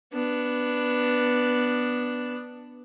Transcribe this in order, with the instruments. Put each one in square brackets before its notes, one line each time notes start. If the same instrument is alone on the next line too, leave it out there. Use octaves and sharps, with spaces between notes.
[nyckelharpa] B3 D4